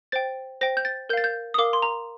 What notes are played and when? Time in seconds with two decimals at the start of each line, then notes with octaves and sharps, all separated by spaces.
0.12 C5 G5 A6
0.61 C5 G5 A#6
0.77 G6
0.85 A6
1.09 A#4 G6
1.13 F5 A6
1.24 G6
1.54 D#6
1.58 A#4 F5 D6
1.73 C6
1.82 A#5